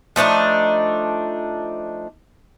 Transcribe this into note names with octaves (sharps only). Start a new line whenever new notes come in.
F3 A3 D4 D#4